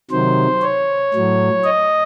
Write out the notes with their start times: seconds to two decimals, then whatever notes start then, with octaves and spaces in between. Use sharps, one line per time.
0.11 C3 D#3 F#3 C5
0.62 C#5
1.14 A2 F#3
1.64 D#5